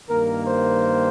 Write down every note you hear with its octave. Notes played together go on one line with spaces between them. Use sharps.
G2 D#3 A#3 A#4
C5